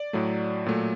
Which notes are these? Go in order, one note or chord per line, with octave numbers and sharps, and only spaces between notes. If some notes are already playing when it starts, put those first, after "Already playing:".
Already playing: D5
A2 F#3 A3
A#2 F#3 A3